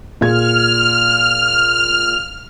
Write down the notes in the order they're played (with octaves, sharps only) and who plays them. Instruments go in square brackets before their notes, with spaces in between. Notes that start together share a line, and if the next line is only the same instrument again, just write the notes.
[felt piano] A#2 G#4 G#6 [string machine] F6